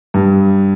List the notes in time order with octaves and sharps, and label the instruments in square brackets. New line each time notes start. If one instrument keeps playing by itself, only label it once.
[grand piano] G2